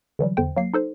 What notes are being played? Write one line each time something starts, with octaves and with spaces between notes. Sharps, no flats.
D3 E3 F#3 G3
E2 D3 C5 G5
F#3 A#3 C7
D#4 A4 C5